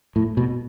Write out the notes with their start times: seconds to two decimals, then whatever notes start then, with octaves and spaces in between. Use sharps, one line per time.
0.16 A2
0.37 B2